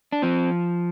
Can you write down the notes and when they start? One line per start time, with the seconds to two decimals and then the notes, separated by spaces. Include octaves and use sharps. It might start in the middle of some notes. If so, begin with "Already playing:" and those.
0.12 D4
0.22 F3 C4